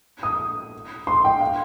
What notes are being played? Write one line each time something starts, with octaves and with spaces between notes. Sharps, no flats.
D#6
C6
G5
F5